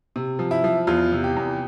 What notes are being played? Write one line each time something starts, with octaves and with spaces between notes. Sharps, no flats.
C3
F3
E4
F3
E2 F4
C3
G4
E2